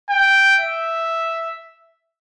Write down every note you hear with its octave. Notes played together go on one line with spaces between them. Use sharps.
G5
E5